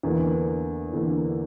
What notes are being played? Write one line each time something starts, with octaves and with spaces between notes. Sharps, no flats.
E2 D3 A#3
E2 D3 A#3